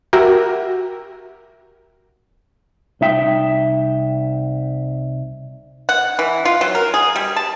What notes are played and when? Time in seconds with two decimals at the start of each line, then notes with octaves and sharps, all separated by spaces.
0.13 F#4 G4 A#4 E5
3.01 C2 D#4 E5 G5
5.89 F#5
6.19 E3
6.45 F4
6.61 F#3
6.75 A#4
6.94 G#4
7.16 G3
7.36 A5